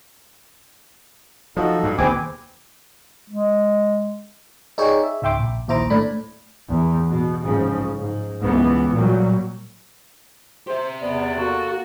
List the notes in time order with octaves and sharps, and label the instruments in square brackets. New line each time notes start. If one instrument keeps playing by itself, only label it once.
[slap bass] F3 [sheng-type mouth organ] D#4 F#4 A4
[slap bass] G2
[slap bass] D#2 B2 D3 [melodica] C4 G#5 D6 [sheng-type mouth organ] G#4 B4
[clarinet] G#3
[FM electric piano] D#4 G#4 C#5 D5 G5
E5
C#2 G#2 E5 G5 C6 D6
A#1
A#1 D#2 E4 C5 A#5 D6
A2 D4 B5
[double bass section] E2
B2
F1 G#2 C#3 F3
G#2
C#2 E3 B3
A#2 F#3 G3
[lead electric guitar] G4 E5 [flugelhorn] C5
[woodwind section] E2 C3 D5 [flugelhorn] B3
[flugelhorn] A#3 [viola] F#4 [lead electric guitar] A4